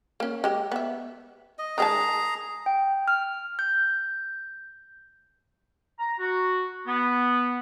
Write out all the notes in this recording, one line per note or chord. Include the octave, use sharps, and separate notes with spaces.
A#3 C#4
G#3 G4
B3 E5
D#5
D#3 G#3 G#4 A5 A#5
G5
F6
G6
A#5
F#4
B3